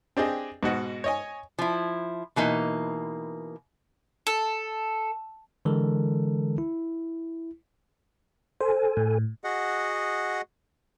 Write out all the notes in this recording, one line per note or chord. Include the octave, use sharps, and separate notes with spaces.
C4 D4 G4 G#4 D#5
G#2 B2 F#4 D#5
C#5 D#5 G#5
F3 E4
B2 E3 A#3 D#4
A4
D3 E3 G#3 A4 A#4
E4
A4 C5 G#5
A2
F#4 G#4 D#5 F#5